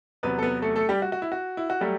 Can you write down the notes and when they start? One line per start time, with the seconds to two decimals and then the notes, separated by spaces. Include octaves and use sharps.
0.23 E2 C3 F#3 B3 B4
0.39 A4
0.43 B3 B4
0.62 A3 A4
0.76 A3 A4
0.89 G3 G4
1.02 F#4
1.12 F#4
1.22 E4
1.32 F#4
1.57 E4
1.70 F#4
1.81 F#3 G3 A3 G4